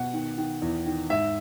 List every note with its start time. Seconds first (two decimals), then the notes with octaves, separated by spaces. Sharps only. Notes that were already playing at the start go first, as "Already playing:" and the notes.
Already playing: B2 F#5
0.13 D#3
0.38 D#3
0.62 E2
0.86 D#3
1.10 G#2 E5